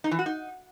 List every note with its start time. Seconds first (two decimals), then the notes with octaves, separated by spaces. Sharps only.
0.04 D#4
0.11 E3
0.19 F#4
0.26 D#4